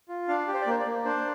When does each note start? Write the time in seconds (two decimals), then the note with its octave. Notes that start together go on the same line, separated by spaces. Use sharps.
0.09 F4
0.28 D4 F5
0.48 G4
0.54 C5
0.62 D5
0.67 A#3 C5
0.79 D5
0.86 A#3
1.05 D4 C5